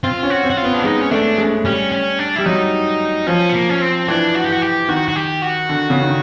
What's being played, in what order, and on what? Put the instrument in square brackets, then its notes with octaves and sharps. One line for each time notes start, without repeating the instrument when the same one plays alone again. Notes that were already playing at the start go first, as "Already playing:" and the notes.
[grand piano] C4 [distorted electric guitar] F4
[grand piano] C#4
[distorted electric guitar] F#4
[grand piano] C4
[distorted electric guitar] F#4
F4
[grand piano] B3
[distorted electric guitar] D4
[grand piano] G#3 [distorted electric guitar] D#4
[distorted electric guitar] C#4
[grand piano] A3 [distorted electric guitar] D4
[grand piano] G#3
[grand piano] G3 [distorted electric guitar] C#4
[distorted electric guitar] C#4
D4
[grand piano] G3 [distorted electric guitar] E4
[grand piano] F#3 [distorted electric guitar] D#4
[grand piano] F3 [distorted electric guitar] C#4
[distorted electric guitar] B3
A#3
C#4
C4
[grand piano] E3 [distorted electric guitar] D4
[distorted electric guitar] F#4
G4
[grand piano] E3 [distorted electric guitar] F#4
[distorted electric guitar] G4
[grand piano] D#3 [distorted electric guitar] F#4
[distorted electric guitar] F#4
G4
F#4
[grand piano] D3
C#3
D#3